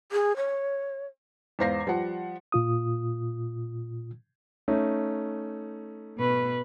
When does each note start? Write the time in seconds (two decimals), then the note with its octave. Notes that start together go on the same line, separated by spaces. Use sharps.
0.12 G#4
0.37 C#5
1.59 E2 G#2 C5 F5 A#6 C7
1.87 F3 G3 F#5
2.52 A#2 F4 D#6
4.68 A3 C#4 D#4
6.18 B2 B4